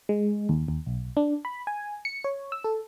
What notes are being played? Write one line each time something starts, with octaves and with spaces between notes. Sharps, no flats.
G#3
D#2
D#2
B1
D4
B5
G#5
C#7
C#5
E6
A4